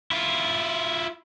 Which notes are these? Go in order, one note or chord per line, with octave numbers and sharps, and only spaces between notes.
E4 F4